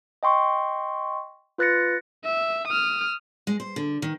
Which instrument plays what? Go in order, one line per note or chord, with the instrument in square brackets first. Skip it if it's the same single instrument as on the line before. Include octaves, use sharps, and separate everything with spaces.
[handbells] D#5 G5 C6 C#6
F4 B4 F#6 A6 A#6 C#7
[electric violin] E5
D#6 F6
[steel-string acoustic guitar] G#3
C5
D3
D#3